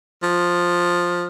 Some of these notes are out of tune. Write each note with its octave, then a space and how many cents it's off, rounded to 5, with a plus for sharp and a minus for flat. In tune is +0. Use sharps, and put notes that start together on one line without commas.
F3 +10